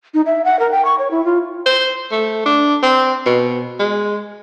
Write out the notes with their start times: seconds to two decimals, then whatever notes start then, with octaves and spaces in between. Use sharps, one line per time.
0.14 D#4
0.26 E5
0.45 F#5
0.59 A#4
0.71 G5
0.85 C#6
0.99 C#5
1.11 E4
1.25 F4
1.66 C5
2.12 A3
2.46 D4
2.83 C4
3.26 B2
3.79 G#3